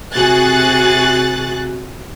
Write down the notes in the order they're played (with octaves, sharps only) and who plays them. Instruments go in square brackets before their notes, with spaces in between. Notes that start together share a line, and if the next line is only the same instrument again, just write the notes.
[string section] C3 F#4 G#4 F#6 A6